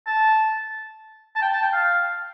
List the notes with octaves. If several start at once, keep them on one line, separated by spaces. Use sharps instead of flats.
A5
A5
G5
A5
G5
F5